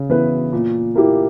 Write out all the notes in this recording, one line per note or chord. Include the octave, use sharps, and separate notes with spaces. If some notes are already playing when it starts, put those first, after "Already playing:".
Already playing: C#3
E3 B3 E4 B4
A#2
A#3 E4 G4